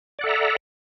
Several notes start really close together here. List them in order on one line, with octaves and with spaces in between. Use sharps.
D5 F#5 A4 E5 A#5